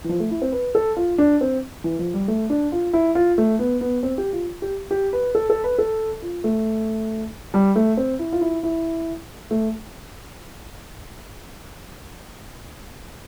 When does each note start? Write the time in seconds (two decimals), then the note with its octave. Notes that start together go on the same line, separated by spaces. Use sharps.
0.04 E3
0.09 F3
0.20 A3
0.31 E4
0.42 C4
0.52 B4
0.75 A4
0.97 F4
1.18 D4
1.41 C4
1.84 E3
1.99 F3
2.14 G3
2.28 A3
2.50 D4
2.72 F4
2.93 E4
3.15 F4
3.38 A3
3.59 B3
3.81 B3
4.03 C4
4.18 G4
4.33 F4
4.62 G4
4.91 G4
5.13 B4
5.35 A4
5.50 A4
5.64 B4
5.79 A4
6.22 F4
6.44 A3
7.54 G3
7.76 A3
7.97 C4
8.19 E4
8.33 F4
8.41 E4
8.63 E4
9.51 A3